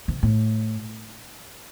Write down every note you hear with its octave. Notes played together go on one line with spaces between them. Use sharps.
C3
A2